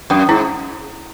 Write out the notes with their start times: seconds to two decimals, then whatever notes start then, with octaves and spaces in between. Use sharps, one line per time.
0.10 F#2 C#4
0.29 G#2 E4